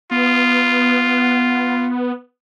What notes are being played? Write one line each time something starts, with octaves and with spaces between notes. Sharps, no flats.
B3 F4